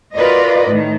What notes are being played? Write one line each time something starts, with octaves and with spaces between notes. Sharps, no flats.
F4 F#4 A#4 B4 D5 D#5
A2 D#3